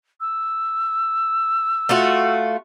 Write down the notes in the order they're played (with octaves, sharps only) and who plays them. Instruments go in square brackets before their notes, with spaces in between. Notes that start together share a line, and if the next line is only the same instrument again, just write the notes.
[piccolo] E6
[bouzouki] A3 F4 F#4